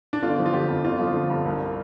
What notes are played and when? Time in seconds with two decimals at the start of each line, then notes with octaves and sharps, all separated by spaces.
0.13 D4
0.23 G1 F4
0.38 F3
0.46 F4
0.53 D3 G4
0.68 F2
0.85 G1 F4
0.99 F3
1.15 D3
1.30 G2
1.45 C2